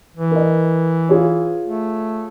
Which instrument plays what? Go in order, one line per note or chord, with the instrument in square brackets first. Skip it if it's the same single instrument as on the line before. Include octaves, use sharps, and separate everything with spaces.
[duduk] E3
[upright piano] A#4 D#5
F4 G#4 C#5
[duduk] A3